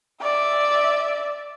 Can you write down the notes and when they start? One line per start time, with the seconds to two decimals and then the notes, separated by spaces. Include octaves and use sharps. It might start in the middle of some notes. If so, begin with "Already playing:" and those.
0.22 D5 E5